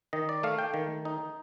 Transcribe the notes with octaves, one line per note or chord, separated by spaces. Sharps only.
D#3 D#5
D5
A3 F5
G5
D#3
D#4